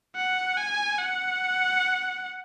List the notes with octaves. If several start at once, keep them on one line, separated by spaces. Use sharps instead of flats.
F#5
G#5
F#5